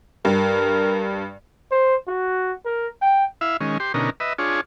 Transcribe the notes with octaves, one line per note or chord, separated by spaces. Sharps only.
G2 A#4
C5
F#4
A#4
G5
E4 E5 F5
D#3 G#3 C#4
G4 C6
B2 D3 C#4 D#4 A#4
B4 D#5 E5
D4 F4 G#4 C#5